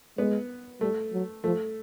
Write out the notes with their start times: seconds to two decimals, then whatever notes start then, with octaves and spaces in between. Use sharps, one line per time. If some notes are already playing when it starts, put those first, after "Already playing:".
0.18 G#3 B3
0.80 G3 A3
1.12 F#3
1.43 F3 A3